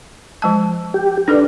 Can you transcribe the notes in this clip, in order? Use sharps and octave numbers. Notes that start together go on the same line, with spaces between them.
F3 G#3 A5
G4
D4 D#4 A4 B4